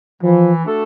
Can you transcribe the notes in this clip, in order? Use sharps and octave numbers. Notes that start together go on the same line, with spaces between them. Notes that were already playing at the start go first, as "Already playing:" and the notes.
E3 F3
A3 D4 F#4 A4